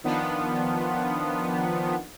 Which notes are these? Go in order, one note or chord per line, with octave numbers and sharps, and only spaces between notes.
D#3 F3 B3 D4 F4